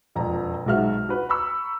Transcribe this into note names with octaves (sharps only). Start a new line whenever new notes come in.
E1 F2 A#5
B1 G#2 G#3 F#4 E5 F6
F#4 B4
A#5 B5 C#6 E6